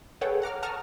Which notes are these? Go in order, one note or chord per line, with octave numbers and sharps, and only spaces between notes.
G#4 A4 B4 C#5 F#5 G5
F#5 A#5 D6 F6
F#5 A5 A#5 C#6 D#6 F6